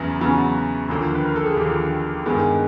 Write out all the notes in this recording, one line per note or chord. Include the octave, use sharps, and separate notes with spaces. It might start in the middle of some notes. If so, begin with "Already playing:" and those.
Already playing: E2 C#3 F#3 B3
E2 C#3 F#3 B3 F#4
D#2 D3 F3 A#3
B4
A#4
A4
G#4
D#2 D3 F3 A#3 G4
G2 D#3 G#3 B3